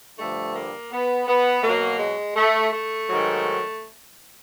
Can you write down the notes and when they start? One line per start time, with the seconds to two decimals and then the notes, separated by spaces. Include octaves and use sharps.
0.19 G2 D3 F3 A3
0.55 A#3
0.92 B3
1.28 B3
1.63 B2 F#3 A#3
1.99 G#3
2.35 A3
2.71 A3
3.08 G#2 D#3 F#3